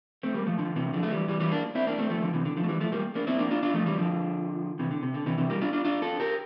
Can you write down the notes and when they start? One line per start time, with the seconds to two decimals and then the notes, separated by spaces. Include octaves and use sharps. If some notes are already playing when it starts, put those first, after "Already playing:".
0.23 A3 C4
0.34 G3 A#3
0.46 F3 A3
0.58 D3 F3
0.76 C3 E3
0.93 D3 F3
1.03 A3
1.11 E3 G3
1.28 E3 G3
1.40 E3 G3
1.52 A#3 D4
1.75 C4 E4
1.87 A#3 D4
1.98 A3 C4
2.10 F3 A3
2.22 D3 F3
2.34 C3 E3
2.45 D3
2.57 D3 F3
2.64 A3
2.69 E3 G3
2.80 F3 A3
2.92 G3 A#3
3.15 A#3 D4
3.27 C4 E4
3.39 A#3 D4
3.51 D4 F4
3.63 D4 F4
3.74 F3 A3
3.86 E3 G3
3.97 D3 F3
4.79 C3 E3
4.91 D3
5.03 C3
5.14 D3
5.26 C3 E3
5.38 C3 E3
5.50 G3 A#3
5.61 D4 F4
5.73 D4 F4
5.85 D4 F4
6.02 F4 A4
6.20 G4 A#4